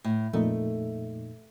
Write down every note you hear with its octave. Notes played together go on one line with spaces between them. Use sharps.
A2
F2 A#2 A3 D#4